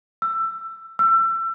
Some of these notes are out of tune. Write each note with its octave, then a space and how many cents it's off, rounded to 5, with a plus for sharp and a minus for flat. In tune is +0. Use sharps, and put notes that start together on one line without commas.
E6 +20
E6 +30